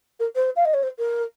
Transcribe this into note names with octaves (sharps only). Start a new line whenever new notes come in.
A#4
C5
F5
D#5
C#5
C5
A#4